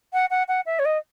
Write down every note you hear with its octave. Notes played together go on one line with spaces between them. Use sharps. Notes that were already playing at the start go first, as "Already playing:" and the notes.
F#5
F#5
F#5
E5
C#5
D#5